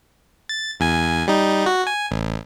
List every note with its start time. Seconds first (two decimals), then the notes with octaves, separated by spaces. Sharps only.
0.49 A6
0.80 E2 G#5
1.28 G3 D#4
1.66 F#4
1.87 G#5
2.11 A1